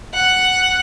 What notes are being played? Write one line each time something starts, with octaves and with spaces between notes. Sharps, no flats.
F#5